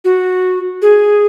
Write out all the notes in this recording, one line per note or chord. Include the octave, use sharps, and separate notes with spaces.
F#4
G#4